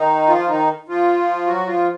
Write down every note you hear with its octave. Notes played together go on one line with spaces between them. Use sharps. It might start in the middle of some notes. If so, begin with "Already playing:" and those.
Already playing: D#3 D#4
F3 F4
D#3 D#4
F3 F4
F#3 F#4
F3 F4